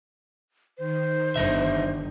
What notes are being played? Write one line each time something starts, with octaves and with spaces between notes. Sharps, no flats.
D#3 C5
G1 E2 D#4 E5